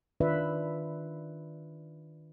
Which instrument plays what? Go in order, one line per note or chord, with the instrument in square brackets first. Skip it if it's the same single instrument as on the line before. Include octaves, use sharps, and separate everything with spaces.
[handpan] D#3 D4 F4 B4 D5 E5